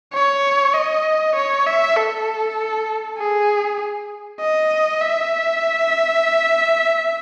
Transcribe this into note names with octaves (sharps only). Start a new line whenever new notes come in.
C#5
D#5
C#5
E5
A4
G#4
D#5
E5